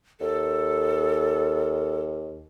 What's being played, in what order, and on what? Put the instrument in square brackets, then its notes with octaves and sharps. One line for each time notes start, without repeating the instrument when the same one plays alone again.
[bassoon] D#2 [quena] A4